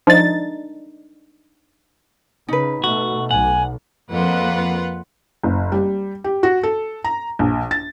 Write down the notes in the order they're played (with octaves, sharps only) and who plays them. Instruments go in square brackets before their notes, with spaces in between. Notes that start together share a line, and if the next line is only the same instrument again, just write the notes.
[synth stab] F3 A6 [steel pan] D4 D#4
[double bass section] C#3 [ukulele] D#4 B4
[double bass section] B2 A3 [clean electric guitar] F#4
[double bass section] B1 [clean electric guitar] F#5 [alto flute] G#5
[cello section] F2 A#3 [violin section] F4 B4 F#5
[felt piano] F#1
G3
G4
F#4
A4
A#5
A#1
A6